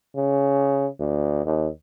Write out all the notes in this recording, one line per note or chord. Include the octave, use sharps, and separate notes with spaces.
C#3
D2
D#2